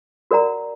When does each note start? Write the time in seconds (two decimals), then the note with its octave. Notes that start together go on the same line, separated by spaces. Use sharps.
0.31 F#4 A#4 D5 F#5 A#5